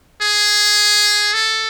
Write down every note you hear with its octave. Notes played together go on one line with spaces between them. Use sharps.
G#4
A4